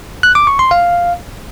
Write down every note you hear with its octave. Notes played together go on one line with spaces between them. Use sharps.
F#6
D6
C#6
C6
F5